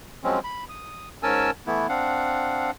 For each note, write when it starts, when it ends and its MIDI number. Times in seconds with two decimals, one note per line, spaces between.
0.24 0.39 53
0.24 0.39 54
0.24 0.39 56
0.24 0.39 60
0.24 0.39 61
0.44 0.64 83
0.69 1.09 87
1.23 1.51 44
1.23 1.51 61
1.23 1.51 70
1.23 1.51 80
1.23 1.51 81
1.23 1.51 88
1.67 1.87 52
1.67 1.87 57
1.67 1.87 59
1.67 1.87 64
1.89 2.71 60
1.89 2.71 62
1.89 2.71 77
1.89 2.71 78